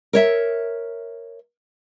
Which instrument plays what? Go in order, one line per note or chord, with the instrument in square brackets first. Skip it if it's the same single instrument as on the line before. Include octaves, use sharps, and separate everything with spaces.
[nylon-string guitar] A#4 C#5 E5